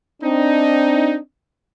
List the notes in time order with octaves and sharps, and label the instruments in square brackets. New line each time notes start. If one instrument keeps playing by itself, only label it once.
[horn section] C4 D4 D#4